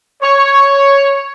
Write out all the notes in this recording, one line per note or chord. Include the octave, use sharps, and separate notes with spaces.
C#5